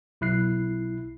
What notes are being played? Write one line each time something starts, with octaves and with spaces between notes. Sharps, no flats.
B1 E4 F#6 C7